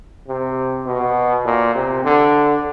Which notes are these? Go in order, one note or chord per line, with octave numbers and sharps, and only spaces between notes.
C3
B2
A#2
C3
D3